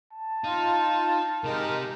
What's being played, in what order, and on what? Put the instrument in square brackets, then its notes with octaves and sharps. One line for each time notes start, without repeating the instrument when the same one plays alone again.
[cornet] A5
[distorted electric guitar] D#4 [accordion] F4
[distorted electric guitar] C3 G4 [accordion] G#3 D#4 A#4